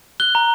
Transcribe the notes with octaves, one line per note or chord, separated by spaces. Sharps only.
F#6 G7
A#5